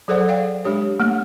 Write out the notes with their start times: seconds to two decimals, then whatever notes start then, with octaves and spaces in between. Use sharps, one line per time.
0.08 F#3 G#4 A4 C5 D5 F#5
0.28 D5 F5 G5
0.65 G#3 D4 G4 C#5
1.00 A3 A#3